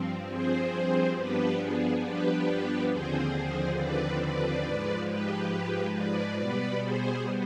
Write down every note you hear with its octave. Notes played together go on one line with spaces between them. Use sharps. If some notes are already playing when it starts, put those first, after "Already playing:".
Already playing: G2 F3 C4
G#4 C5
G2 F3 B3 D4 G4 B4
G#4
G4 B4
D#2 D3 F3 C4 G#4 C5
G#4 C5
B4 D5
B4 D5
G#2 F3 G#3
G4 B4
B4 D5
B2 G3 B3 B4 D5
G#4 C5